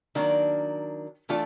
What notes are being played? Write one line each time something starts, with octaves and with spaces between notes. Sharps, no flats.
D#3 F#3 A#3 D4
E3 A3 D4 F4 A4